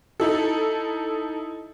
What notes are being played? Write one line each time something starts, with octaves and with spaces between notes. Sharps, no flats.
D#4 E4 A4